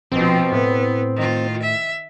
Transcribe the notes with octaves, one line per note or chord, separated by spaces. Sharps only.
A#1 B2 F3 C4
A2 B3
D#3 F4
E5